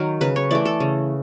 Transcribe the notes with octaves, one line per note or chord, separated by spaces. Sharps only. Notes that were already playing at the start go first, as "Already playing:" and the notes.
Already playing: D#3 F#3 A#4
C#3 B4
C#5
E3 A3 D5
A4
C#3